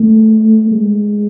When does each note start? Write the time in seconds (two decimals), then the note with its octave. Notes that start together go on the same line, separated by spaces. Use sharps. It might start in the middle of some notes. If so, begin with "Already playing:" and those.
Already playing: A3
0.72 G#3